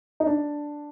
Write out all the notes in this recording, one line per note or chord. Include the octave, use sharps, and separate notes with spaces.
D#4
D4